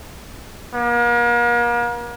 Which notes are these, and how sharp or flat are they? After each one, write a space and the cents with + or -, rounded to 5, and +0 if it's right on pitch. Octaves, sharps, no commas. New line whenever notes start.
A#3 +40